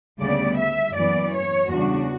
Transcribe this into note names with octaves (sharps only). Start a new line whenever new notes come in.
D2 C#3 G3 B3 D5
E5
F#2 E3 B3 D5
C#5
E2 C#3 G3 D4 F#4